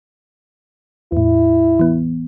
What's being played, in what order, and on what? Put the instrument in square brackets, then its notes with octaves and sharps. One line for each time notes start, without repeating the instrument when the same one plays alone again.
[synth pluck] E2 A2 [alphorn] E4
[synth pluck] E3 B3